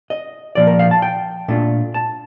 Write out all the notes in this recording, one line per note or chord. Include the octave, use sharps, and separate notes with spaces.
D#5
A#2 F3 A#3 D5
A#4
F5
A5
G5
A#2 A3 D4 F4
A5